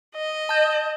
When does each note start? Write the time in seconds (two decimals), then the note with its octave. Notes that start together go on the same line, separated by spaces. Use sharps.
0.16 D#5
0.49 A5 G6